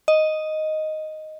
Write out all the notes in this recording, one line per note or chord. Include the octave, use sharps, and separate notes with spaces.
D#5